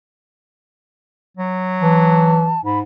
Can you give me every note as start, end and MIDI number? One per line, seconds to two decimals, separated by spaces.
1.37 2.50 54
1.82 2.57 52
1.82 2.64 81
2.65 2.83 44
2.65 2.79 83